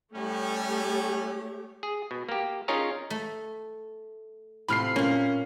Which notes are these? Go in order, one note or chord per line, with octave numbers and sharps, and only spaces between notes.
A2 G3 A3 C#4 G4 C#5
G#4
B2
A#3 G4
C#4 D#4 F4 G#4 A#4 C#5
A3
A2 C3 F4 B5 F6 C7
A#2 A#3 C#4